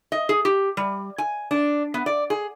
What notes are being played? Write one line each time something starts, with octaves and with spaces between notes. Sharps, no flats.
D#5
G#4
G4
G3
G#5
D4
B3
D5
G#4